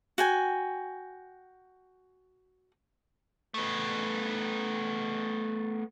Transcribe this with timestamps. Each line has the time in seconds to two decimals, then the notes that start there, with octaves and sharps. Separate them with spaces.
0.18 F#4 G5 G#5
3.54 A3 B3